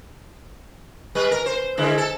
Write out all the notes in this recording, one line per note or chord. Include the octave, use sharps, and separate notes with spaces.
G3 B4
A#4
C5
D3 G#3 E4
A4